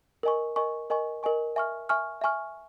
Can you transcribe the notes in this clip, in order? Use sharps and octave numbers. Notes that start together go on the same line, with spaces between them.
A#4 D#5 G#5 C#6
A#4 D#5 G#5 C#6
A#4 D#5 G#5 C#6
A#4 D#5 G#5 C#6
E5 G#5 C#6 F6
E5 G#5 C#6 F6
E5 G#5 C#6 F6